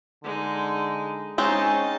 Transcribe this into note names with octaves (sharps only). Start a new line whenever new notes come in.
D3 G#3 D#4
G#3 C4 C#4 D#4 A5